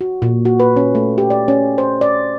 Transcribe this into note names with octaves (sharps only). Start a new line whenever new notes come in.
F#4
A#2
F#4
B4
C#4
A3
G4
D5
C#4
C5
D5